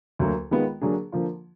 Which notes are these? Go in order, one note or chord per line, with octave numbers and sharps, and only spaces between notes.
D2 D3 F#3 A#3
D#3 G#3 B3 F4
D3 F#3 A#3 D4 G#4
D3 F3 A#3 F4